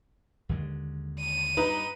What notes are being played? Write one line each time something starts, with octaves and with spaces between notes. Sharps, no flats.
D#2 D3 G#3
D#7
G2 D#4 B4